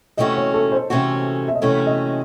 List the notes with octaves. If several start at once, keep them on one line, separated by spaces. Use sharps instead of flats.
C3 E3 A3 C#4 F#4 D#5
C#5
A4
C5
C3 E3 A3 C#4 F#4
E5
D#5
C3 E3 A3 C#4 F#4 C#5
D#5